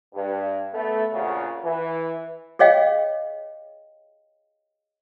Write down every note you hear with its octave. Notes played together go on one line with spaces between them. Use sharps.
G2
A3 B3
A#1 A#2 C#3 F#4
E3
G4 G#4 C#5 D#5 F5 G5